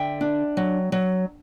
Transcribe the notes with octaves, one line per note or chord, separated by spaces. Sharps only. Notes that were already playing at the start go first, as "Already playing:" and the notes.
Already playing: D3 E5 G5
D4
F#3
F#3